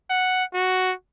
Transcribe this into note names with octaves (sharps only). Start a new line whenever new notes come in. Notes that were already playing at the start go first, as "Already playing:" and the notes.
F#5
F#4